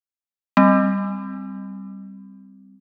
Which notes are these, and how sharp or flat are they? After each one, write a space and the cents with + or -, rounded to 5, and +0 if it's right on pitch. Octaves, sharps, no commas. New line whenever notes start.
G3 +0 C4 +0